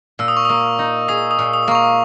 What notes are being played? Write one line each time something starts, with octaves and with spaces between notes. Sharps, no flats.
A#2 E6
D#6
C#6
A#3 D#6
D#4
G#4 D#6
D#6
A#2
D#6
A#3 C#6
D#6